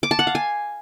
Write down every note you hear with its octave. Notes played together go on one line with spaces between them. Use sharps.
D6
A5
F#5
F5
G#5